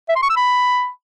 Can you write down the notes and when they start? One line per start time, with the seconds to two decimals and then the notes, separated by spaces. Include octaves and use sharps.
0.09 E5
0.16 C6
0.23 C#6
0.29 E6
0.36 B5